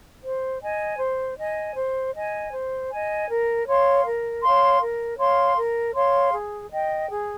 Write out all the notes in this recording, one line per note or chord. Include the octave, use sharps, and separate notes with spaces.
C5
D#5 G#5
C5
D#5 G#5
C5
D#5 G#5
C5
D#5 G#5
A#4
C#5 F5 C6
A#4
C#5 F5 C6
A#4
C#5 F5 C6
A#4
C#5 F5 C6
G#4
D#5 G5
G#4